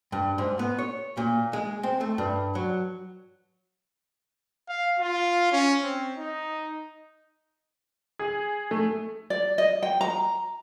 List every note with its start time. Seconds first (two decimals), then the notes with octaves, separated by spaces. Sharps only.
0.12 G2
0.38 G#2
0.59 B3
0.79 C#5
1.17 A#2
1.53 G#3
1.83 C4
2.01 A3
2.18 G2
2.55 F#3
4.69 F5
4.99 F4
5.52 C#4
5.83 C4
6.17 D#4
8.19 G#4
8.71 A3
9.30 D5
9.58 D#5
9.83 G5
10.01 A#5